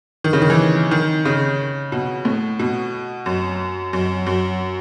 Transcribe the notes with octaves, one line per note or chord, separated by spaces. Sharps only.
D#3
C#3
D#3
E3
D#3
C#3
B2
A2
B2
F#2
F#2
F#2